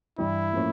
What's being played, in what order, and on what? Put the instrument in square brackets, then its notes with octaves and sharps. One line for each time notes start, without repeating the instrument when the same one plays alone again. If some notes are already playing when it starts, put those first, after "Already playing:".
[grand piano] G2 E3 G3 [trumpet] E4
[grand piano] A2 F3 A#3 C#4